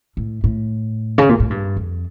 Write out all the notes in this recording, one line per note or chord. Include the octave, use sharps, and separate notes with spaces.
A2
A2
C#3
A#2
A2
G2
F2